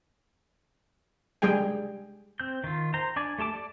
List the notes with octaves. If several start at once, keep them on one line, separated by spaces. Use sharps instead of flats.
G3 G#3 G#4 G5 G#5
C4 G6
D#3 F4
C5 G5 A#5
D4 D5 G#5
A3 G4 A5 D6
D5